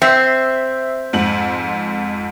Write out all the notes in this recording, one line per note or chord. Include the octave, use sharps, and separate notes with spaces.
C4 E5 C7
F2 G#2 F#7